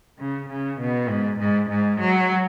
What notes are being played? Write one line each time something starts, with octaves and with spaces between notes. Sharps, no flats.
C#3
C#3
B2
G#2
G#2
G#2
F#3